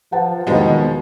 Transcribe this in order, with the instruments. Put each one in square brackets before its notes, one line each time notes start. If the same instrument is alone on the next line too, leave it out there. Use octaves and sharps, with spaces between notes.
[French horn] F3 [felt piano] B4 F#5 A5
[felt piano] E2 D#3 [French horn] B2 [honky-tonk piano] F3 G#3 B3